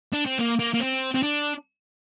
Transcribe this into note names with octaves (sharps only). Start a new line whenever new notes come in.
D4
C4
A#3
A#3
A#3
C4
C4
D4